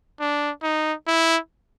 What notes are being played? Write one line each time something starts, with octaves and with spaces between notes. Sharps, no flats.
D4
D#4
E4